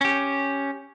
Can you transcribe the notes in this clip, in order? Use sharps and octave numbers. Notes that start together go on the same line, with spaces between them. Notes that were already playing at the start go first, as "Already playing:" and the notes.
C#4 G4